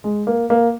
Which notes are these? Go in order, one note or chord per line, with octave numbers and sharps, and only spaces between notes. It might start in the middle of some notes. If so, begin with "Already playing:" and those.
G#3
A#3
A#3